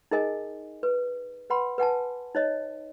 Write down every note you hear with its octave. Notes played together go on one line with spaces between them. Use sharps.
D#4 G#4 A#4 D#5 G#5
B4
B4 F#5 B5 C6
B4 F#5 G#5 A5
D#4 C#5 D#5